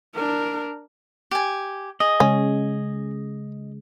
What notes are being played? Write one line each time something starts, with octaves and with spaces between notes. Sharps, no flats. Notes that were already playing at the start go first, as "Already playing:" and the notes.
D4 A#4
G4 G#5
G#4 D#5
C#3 G#3 C#4